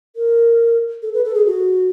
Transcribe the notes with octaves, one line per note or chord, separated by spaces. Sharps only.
A#4
A4
B4
A4
G#4
F#4